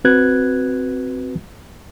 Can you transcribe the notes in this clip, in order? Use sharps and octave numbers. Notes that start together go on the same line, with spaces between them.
C4 F#4 B4 F#6 G#6